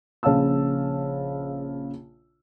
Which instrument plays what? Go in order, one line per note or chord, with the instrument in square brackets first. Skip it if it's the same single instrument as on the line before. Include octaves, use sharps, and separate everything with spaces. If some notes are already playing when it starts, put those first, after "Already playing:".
[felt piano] A#1 C#3 C#5 F5 A5 E6